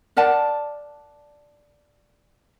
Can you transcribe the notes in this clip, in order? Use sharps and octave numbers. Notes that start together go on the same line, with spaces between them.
A#4 D5 F#5 A5